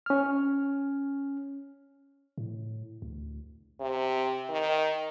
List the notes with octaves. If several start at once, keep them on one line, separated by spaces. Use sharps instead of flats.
C#4 F6
A2
D2
C3
D#3